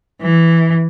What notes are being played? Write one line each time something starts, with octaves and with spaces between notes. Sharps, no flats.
E3